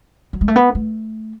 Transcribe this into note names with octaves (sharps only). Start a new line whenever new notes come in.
F#3
G#3
A3
B3
A3